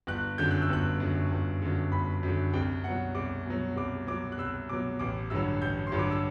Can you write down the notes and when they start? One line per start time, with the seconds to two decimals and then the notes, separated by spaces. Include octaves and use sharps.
0.07 G1 F#6
0.38 F#2 D3 G6
0.51 F#6
0.62 E6
0.69 G1 F#6
1.00 F#2 D3
1.31 G1
1.62 F#2 D3
1.92 G1 B5
2.23 F#2 D3
2.53 C2 G5
2.84 B2 F#3 F#5
3.15 C2 D6
3.46 B2 F#3
3.76 C2 D6
4.07 B2 F#3 D6
4.32 F#6
4.38 C2 E6
4.69 B2 F#3 D6
4.99 A1 D6
5.30 G2 D3 F#3 E6
5.62 A1 G6
5.87 C6
5.92 G2 D3 F#3
5.99 D6
6.11 E6